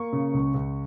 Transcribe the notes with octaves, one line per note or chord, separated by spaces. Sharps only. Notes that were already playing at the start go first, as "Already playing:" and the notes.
Already playing: A#3 C#6
C#3
C#2
C#2